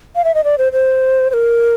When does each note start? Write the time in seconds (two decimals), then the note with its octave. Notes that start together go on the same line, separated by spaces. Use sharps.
0.16 F5
0.24 E5
0.34 D#5
0.44 D5
0.58 C5
0.72 C5
1.30 C5
1.34 A#4